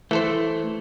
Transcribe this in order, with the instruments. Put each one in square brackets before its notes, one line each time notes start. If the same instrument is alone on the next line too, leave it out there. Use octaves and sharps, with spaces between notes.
[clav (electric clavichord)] E3 A4 C5 [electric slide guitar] A3